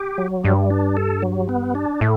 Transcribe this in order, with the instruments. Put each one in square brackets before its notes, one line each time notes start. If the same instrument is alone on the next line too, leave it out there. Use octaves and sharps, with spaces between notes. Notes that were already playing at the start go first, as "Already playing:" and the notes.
Already playing: [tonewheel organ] G4
F#3
[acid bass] G2 [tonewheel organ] G3
[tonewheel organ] D4
A4
F#3
B3
D4
[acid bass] A2 [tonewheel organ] A3